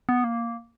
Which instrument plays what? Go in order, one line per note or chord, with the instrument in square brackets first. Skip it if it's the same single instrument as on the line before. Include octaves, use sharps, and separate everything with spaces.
[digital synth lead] B3
A#3